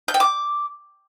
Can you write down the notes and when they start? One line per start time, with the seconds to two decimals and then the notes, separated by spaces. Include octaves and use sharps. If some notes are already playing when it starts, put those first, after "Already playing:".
0.08 G6
0.14 G5
0.20 D6